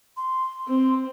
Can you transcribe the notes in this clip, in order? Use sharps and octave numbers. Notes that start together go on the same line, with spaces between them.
C6
C4